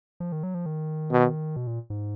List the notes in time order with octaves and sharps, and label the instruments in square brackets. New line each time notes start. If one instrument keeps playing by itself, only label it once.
[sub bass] F3
D#3
F#3
F3
D#3
[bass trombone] B2
[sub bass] B2
A#2
G#2